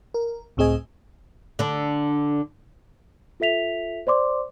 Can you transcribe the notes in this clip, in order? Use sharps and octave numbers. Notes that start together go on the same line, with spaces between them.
A#4
C#2 A2 C4 G#4 D#5 G#5
D3 D4
F4 A4 E5 B6 F7
C5 D5 C6 D6